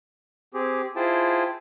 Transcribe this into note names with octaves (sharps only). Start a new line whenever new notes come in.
C4 G4 G#4
E4 F4 G#4 C5 G5 A5